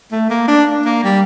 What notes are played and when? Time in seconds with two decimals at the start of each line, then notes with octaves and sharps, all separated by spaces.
0.12 A3
0.30 A#3
0.48 D4
0.85 A#3
1.04 G3